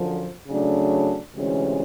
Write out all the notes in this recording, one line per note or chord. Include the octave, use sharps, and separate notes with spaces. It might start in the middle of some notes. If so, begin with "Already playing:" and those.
Already playing: F#2 D3 F3
C#3 F#3 A3 D4
D2 C3 E3 G#3 C#4